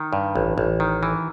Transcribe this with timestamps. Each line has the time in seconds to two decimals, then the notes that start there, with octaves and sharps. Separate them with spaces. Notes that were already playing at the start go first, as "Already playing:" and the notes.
Already playing: D#3
0.13 G2
0.36 A1
0.58 A1
0.80 D#3
1.03 E3